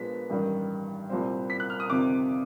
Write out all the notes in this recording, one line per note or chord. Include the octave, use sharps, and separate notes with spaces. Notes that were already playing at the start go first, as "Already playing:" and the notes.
Already playing: A#2 F3 G#3 B3 D4 B6
A1 G2 D#3 G3
C2 A#2 G3 C4
B6
F#6
F6
D#6
G1 F2 C3 D#3 D6